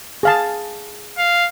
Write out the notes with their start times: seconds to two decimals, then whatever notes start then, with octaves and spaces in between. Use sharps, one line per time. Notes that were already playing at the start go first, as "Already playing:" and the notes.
0.23 G#4 F5 A5
1.18 F5